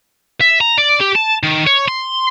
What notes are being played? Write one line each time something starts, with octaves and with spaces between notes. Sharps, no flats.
E5
A#5
D5
G4
A5
D#3
C#5
C6